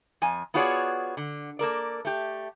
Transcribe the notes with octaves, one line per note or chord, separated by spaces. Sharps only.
F2 G#5
B3 F4 F#4 G#4 C#5 D5
D3
A#3 A4 A#4 D5
A3 G4